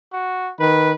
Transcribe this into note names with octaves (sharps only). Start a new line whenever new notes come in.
F#4
D#3 B4